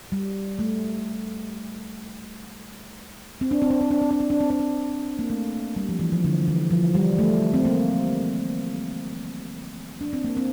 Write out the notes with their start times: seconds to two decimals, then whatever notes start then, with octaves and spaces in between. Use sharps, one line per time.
0.12 G3
0.59 A3
3.41 C4
3.51 D4
3.62 C4
3.70 D4
3.81 C4
3.91 D4
4.01 C4
4.11 D4
4.20 C4
4.30 D4
4.40 C4
4.50 D4
4.60 C4
5.19 A#3
5.30 A3
5.76 G3
5.89 F3
5.99 E3
6.12 F3
6.24 D3
6.48 E3
6.71 F3
6.95 G3
7.19 A3
7.54 C4
7.65 A#3
10.01 D4
10.13 C4
10.24 A#3
10.37 C4